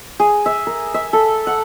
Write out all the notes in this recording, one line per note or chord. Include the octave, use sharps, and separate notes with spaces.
G#4
E5
A#4
E5
A4
F#5